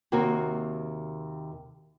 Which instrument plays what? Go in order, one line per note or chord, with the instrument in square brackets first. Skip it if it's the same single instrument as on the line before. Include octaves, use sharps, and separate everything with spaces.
[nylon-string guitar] D#2 C3 A#3 F#4 A#4